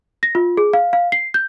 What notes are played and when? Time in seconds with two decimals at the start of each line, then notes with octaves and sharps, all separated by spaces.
0.23 A#6
0.35 F4
0.57 G#4
0.73 F5
0.93 F5
1.12 C7
1.34 G6